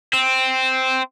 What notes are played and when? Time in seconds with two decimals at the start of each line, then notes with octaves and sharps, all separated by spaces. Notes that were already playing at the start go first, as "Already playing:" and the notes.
0.14 C4